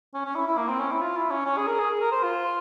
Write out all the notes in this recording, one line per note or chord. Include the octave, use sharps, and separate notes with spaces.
C#4
C#4
E4
E4
A#3
C4
C#4
E4
F4
E4
C#4
C#4
G#4
A#4
G#4
A#4
C5
F4